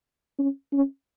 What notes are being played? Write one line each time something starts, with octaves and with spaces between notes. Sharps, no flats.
C#4
C#4